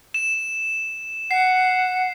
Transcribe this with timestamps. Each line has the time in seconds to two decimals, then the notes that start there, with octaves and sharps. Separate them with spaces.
0.14 E7
1.31 F#5 C7